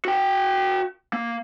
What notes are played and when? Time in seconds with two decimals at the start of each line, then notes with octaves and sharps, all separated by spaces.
0.05 F#4 G5
1.13 A#3